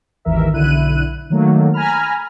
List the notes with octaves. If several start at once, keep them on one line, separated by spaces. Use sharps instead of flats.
G#1 D#2 E3 A#4 E5
B1 D3 E4 F#6 D#7
D#3 F#3 A3 A#3
G#5 A#5 B5 F6